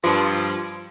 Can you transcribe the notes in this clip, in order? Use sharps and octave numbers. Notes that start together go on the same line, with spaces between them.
G2 F3